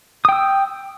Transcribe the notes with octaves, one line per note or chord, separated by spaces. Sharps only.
G5 D#6 E6